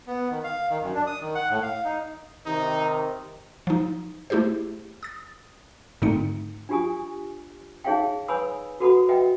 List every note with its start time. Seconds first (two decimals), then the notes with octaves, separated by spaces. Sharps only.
0.07 B3
0.30 D#3
0.44 F5
0.70 D#3
0.82 F#2
0.95 D4
1.07 D#6
1.21 D#3
1.35 F#5
1.50 A2
1.62 F5
1.84 D#4
2.46 C3 D#3 D#4
3.67 F3 D#4
4.30 A3 E4 G4 G#4 C5
5.03 D#6 A6
6.02 G#2 D3 A3 C4 D#4 C#7
6.69 D4 F4 G4 G#5 D#6
7.84 D#4 G#4 C#5 E5 F5 G5
8.28 B4 C#5 G#5 B5 D#6 E6
8.80 F#4 A4 B4 F#5 B5 D#6
9.09 B4 D#5 E5 F#5 G5